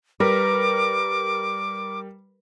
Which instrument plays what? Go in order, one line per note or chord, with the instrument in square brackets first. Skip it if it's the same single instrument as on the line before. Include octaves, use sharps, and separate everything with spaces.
[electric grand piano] G3 A#4 [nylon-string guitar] B4 [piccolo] D6